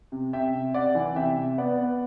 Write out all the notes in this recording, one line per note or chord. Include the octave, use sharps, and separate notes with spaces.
C3
C3 E5 G5
C3
C3 D5 F#5
E3
C3 E5 G5
C3
B3 D5 F#5
B3